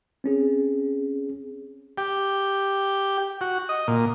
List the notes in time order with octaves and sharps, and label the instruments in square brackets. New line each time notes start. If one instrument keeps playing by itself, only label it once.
[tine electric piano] C4 C#4 G#4
[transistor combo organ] G4
F#4
D#5
A#2